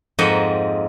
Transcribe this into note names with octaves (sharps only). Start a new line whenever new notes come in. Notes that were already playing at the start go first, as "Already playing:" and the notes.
F2 G#2 A#3 D#5 F#5 G5